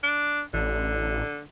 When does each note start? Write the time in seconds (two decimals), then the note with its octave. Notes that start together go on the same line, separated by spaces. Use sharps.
0.03 D4
0.54 A1 D3